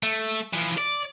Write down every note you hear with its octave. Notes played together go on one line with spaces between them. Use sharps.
A3
E3 F3
D5